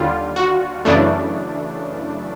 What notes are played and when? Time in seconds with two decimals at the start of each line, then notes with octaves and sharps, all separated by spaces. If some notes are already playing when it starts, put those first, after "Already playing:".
Already playing: D#2 D3 G3 F4
0.36 F#4
0.85 F#2 C#3 E3 A3 D4